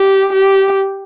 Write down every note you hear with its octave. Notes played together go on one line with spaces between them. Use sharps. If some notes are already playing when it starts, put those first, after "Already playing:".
Already playing: G4
G4